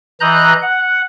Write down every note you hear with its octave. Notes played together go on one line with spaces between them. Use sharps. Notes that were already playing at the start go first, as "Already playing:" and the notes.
E3 D#5 A#5 F#6 G6
F#5